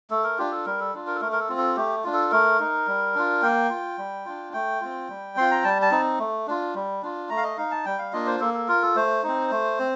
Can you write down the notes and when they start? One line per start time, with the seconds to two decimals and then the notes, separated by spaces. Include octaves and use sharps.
0.10 A3 A4
0.24 A#4
0.38 D4 F4 G4
0.52 A4
0.66 G3 A#4
0.80 A4
0.94 D4 F4
1.07 A#4
1.15 A4
1.21 A3 A#4
1.32 A#4
1.40 A4
1.49 C4 F4
1.58 A4
1.76 A3 G4
2.04 D4 F4
2.13 A4
2.32 A3 A#4
2.59 D#4
2.87 G3
3.15 D4 F4
3.42 A#3 G5
3.70 F4
3.98 G3
4.25 D4 F4
4.53 A3 G5
4.81 C4 F4
5.09 G3
5.36 C4 F4 C6
5.51 A#5
5.64 G3 A5
5.82 A5
5.91 C4 D#4
6.19 A3
6.47 D4 F4
6.75 G3
7.02 D4 F4
7.30 A3 A#5
7.37 F5
7.43 D#5
7.57 D#4 F5
7.71 A5
7.85 G3 G5
7.99 F5
8.13 A#3 D4 F4 D#5
8.27 C5
8.40 A#3 A4
8.54 A4
8.68 F4 A#4
8.82 A4
8.96 A3 C5
9.23 C4 D#4
9.51 A3
9.79 C4